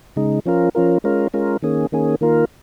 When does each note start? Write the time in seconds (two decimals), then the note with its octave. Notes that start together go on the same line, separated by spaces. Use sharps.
0.16 C#3 G#3 D#4
0.46 F3 C#4 F4 A#4
0.75 F3 C#4 F4 A#4
1.04 G#3 C#4 F4 A#4
1.34 G#3 C#4 F4 A#4
1.62 D#3 A#3 C#4 G#4
1.92 D#3 A#3 C#4 G#4
2.21 D#3 A#3 F4 A#4